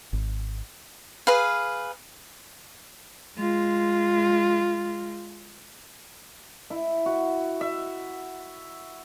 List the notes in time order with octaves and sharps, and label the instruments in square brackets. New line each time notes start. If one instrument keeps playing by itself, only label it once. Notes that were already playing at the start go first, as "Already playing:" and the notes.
[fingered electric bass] G#1
[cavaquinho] G#4 B4 F5
[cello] G#3 F4
[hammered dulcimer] E4
F#4
E5